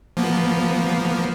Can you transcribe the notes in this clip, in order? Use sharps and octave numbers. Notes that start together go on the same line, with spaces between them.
F3 A#3 B3